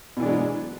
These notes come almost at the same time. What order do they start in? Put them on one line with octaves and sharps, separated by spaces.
B2 E3 D4 G#3 F#3